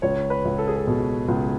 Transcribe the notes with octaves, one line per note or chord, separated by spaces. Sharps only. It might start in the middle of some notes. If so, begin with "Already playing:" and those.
C#2 C#5
B4
C#2
A4
G#4
A4
B2
C#2